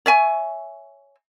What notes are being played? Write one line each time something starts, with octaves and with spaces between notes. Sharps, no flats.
C#5 E5 G#5